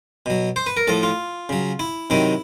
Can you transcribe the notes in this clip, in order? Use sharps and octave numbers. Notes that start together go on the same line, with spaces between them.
B2 F#3
C5
B4
A#4
A2 F3 A4
F4
C#3 F#3
E4
C3 D#3 F#3 E4